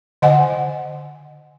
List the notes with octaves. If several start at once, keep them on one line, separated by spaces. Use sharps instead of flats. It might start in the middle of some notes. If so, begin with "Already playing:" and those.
D3 D#5 F#5 G#5